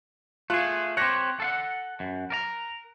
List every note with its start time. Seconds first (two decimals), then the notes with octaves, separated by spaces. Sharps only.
0.50 A3 F4 G#4 F#6
0.97 C4 G4 C#5 F#6 A#6
1.40 A4 F5 F#5
2.00 F#2
2.30 A#4 D5 A#5